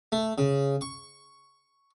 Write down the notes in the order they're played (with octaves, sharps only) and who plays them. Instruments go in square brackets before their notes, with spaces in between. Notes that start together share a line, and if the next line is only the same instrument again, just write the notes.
[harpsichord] A3
C#3
C#6